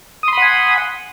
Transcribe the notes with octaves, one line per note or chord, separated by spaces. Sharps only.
F#5 G#5 B5 C6 D#6